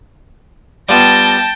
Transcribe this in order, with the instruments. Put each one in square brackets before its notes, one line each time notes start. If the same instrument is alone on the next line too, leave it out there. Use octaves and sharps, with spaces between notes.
[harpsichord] G3 B3 F4 [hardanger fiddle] G5 [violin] A5 A#6